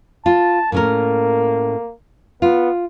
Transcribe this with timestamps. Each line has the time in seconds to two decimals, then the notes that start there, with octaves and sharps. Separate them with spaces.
0.26 F4 A5
0.72 A2 A#3 C#4 A#4
2.42 B3 F4